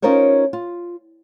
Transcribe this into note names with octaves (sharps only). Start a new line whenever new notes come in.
C#4 D#4 F4 A#4 C5 C#5
F4